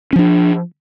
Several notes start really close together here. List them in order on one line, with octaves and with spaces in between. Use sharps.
C#4 F3 D4